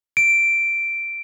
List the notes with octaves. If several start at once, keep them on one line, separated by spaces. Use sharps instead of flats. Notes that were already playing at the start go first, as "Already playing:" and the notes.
D7